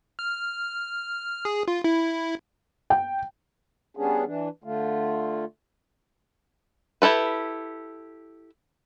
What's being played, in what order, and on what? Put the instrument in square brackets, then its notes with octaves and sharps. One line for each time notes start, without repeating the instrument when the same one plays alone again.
[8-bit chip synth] F6
G#4
F4
E4
[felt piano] G5
[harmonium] G3 B3 C#4 D4 G#4
E3 D4
D3 A3 F4
[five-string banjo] E4 G4 A4 B4